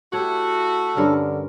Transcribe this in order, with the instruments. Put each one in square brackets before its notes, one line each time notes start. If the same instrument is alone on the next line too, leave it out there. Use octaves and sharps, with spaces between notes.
[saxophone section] A3 E4 F#4 [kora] G4 C#5 [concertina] A4
[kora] G2 C#4 A#4 [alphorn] D3